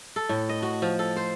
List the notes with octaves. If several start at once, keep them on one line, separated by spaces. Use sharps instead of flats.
A4
A2
D#5
F#4
F3
A4
C5